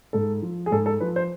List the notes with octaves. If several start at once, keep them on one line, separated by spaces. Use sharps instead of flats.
G#2 A4
F3
G#4
G#2 A4
A4
F3 B4
C5